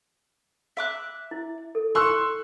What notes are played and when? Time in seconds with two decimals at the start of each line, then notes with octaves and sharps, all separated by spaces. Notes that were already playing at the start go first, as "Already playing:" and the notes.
0.77 E5 D6 F#6
1.31 E4
1.75 A4
1.95 A4 C6 C#6 E6 F#6